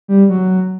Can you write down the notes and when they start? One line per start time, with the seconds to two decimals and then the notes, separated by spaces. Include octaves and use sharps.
0.08 G3
0.29 F#3